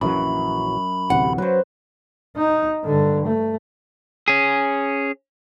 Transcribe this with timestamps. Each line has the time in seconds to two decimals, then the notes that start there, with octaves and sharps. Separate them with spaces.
0.01 A#1 F#2 E3 F#3 B5
1.10 A1 D2 C3 F#5
1.38 F#3 B4 C5
2.36 D#4
2.84 G2 D3
3.25 A3
4.28 C#4 G#4